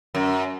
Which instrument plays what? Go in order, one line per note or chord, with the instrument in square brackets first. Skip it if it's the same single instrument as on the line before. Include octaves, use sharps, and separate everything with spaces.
[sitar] F#2